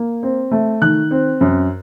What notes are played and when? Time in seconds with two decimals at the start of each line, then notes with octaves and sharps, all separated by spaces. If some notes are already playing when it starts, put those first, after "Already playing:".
Already playing: A#3
0.23 C4
0.51 A3
0.82 D#3 F#6
1.11 C4
1.41 F#2